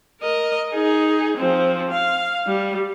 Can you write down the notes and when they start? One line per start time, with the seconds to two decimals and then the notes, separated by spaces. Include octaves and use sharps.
0.21 A#4 D#5
0.73 D#4 G#4
1.37 F3 C4
1.91 F5
2.46 G3